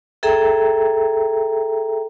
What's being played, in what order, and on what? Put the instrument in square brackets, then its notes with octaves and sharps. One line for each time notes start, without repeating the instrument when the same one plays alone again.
[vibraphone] G#4 A4 E5 G5 A#5